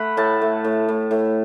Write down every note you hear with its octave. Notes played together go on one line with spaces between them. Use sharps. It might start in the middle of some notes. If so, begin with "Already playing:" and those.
Already playing: A3 F#5 B5
A2 A5
A3
A2
A2
A2